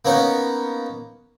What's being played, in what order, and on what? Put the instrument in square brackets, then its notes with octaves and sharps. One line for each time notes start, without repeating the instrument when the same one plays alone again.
[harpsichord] A#3 B3 C#4 D#4